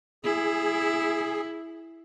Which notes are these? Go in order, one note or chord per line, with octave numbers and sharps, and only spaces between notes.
E4 G#4